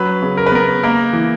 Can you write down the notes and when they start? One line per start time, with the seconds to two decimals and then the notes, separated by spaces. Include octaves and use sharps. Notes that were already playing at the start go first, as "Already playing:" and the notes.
Already playing: F#3 C#4 B4
0.22 C#3
0.37 A#4
0.46 B4
0.52 B3 A#4
0.83 A#3 A#4
1.13 E3